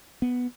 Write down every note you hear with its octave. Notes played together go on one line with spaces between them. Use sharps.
B3